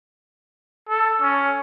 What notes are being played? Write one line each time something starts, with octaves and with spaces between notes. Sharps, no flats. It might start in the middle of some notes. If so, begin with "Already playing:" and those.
A4
C#4